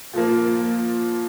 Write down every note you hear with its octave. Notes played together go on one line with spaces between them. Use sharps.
A#2 F3 A#3